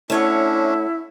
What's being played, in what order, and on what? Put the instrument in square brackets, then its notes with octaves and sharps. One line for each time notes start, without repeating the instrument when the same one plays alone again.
[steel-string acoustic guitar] A3 C#5 F#5 [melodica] C#4 D4 [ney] E4